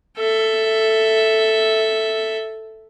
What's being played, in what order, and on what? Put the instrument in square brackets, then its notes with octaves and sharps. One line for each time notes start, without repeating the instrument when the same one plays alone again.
[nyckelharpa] A4 E5